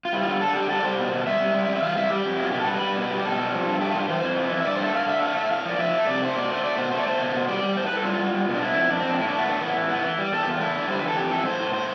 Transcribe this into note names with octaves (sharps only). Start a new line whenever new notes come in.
F4
G3 E4
F4
D3
D3 A4
G3 G4
G3 A4
D5
G3 C5
B2
B2
G3 E5
G3
G3
G3
E5
E3 F5
G3 E5
G3 G4
F2
E4
B2 F4
B2 G4
A4
G3 B4
G3
B2
G3
G4
B2 A4
G3
F3
G2
A3 G4
F4
G2 G4
E3 C5
F2
E3
F2
E5
G2 D5
C5
A3 A4
D3 F5
D3 E5
A3 F5
A2 E5
A2 F5
F3 D5
F3 E5
A3
C3 D5
A3 C5
B2 D5
A3 C5
A3 D5
B2 C5
A3 C5
D5
A3 C5
B2
B2
G3 D5
G3
A2 C5
B4
A2 A4
G3 F4
G3
G3
B2
D4
D3 E4
F2
F2 D4
C4
F2
D4
A2 E4
D4
A3
B3
A2 D4
E3 B3
A2
A2 B3
E3
G3
E2 A4
G4
E2 F4
A3 E4
D3
G3 C5
B4
E3
A4
F2 G4
E3 A4
A2 C5
A2
A2 C5